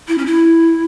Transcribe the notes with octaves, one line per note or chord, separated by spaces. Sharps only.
E4
C#4
E4